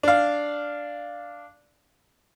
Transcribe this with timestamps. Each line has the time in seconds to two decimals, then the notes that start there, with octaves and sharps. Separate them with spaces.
0.03 D4 F5